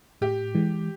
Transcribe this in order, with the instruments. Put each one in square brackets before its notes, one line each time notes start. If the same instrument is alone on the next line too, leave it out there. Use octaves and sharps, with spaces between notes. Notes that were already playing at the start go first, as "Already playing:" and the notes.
[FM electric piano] A2 [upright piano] G4
[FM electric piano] E3 G#3